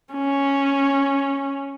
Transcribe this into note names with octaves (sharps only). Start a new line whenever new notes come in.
C#4